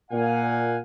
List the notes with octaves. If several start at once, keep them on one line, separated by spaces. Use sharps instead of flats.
A#2 F5 F#5 G#5